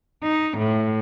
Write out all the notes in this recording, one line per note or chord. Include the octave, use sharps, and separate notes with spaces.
D#4
A2